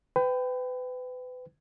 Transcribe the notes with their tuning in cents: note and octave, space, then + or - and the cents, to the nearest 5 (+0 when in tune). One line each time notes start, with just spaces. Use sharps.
B4 +30 G5 +0